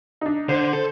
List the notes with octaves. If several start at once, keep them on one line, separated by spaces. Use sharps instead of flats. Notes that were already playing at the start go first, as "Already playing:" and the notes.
D4 D#4
D3 C5
A4